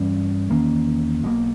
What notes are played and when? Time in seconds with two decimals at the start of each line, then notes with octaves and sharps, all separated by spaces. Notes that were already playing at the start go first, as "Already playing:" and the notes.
Already playing: G2 E3 G3 C#4
0.50 E2 D#3 A#3 C#4
1.23 B1 B2 G3 A#3